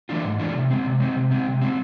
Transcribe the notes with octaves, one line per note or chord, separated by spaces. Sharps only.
E3 A3 D4 F4
G#2
E3 A3 D4 F4
C3
G#3 C4
C3
G#3 C4
C3
G#3 C4
C3
G#3 C4